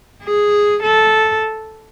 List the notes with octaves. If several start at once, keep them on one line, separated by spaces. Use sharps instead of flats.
G#4
A4